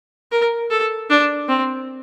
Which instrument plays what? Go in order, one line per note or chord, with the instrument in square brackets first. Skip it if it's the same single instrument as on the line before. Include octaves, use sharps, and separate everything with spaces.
[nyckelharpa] A#4
A4
D4
C4